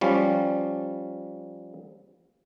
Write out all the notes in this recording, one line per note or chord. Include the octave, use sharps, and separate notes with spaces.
F3 G3 C#4